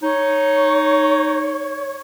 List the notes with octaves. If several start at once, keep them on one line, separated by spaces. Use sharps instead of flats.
D#4 C#5